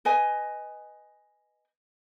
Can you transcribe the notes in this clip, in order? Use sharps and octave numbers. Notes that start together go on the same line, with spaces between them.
B4 D#5 G#5